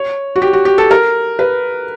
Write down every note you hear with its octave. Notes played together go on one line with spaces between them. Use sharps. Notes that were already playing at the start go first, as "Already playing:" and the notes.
Already playing: C#5
F#4
G4
F#4
G4
A4
A#4
B4